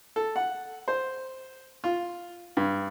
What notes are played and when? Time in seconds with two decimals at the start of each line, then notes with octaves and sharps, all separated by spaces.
0.16 A4
0.36 F#5
0.88 C5
1.84 F4
2.57 G2